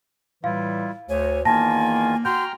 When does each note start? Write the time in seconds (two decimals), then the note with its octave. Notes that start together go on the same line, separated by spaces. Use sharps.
0.44 A2 E3 G3 E4 F4 F5
1.09 D2 A3 C#5 G#5
1.45 E2 D#3 A#3 F4 G#5 A5 A#6
2.25 F#4 G5 A#5 C6 F6 G6